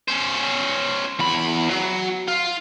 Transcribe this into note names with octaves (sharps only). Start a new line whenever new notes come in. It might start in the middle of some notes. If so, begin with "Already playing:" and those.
C#4 C5
E2 B5
F#3
F4